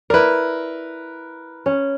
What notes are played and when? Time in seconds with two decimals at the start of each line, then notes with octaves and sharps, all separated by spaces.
0.10 E4 A#4 B4 D5
1.66 C#4